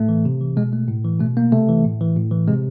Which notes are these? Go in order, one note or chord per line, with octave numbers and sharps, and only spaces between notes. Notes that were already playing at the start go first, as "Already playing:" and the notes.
Already playing: A2 A3
E3
C3
E3
B2 G#3
A3
A2
E3
B2 A3
A#3
C3 A3
E3
A2
E3
A2
E3
C3 G#3